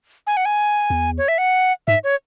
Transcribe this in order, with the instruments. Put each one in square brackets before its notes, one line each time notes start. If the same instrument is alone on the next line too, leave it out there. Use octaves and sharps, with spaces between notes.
[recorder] G#5
F#5
G#5
[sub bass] E2
[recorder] C#5
E5
F#5
[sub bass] G#2 [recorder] E5
[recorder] C#5